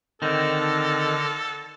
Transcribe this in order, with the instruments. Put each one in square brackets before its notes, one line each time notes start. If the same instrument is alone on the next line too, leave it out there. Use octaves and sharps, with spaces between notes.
[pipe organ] D3 F6 A#6 [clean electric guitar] D#3 C4 [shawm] A4